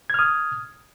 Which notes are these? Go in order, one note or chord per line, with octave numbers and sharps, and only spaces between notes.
D#6 F6 G#6